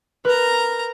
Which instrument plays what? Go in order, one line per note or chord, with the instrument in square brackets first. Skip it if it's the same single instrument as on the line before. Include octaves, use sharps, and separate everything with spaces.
[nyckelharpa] A#4 A#5 [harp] B4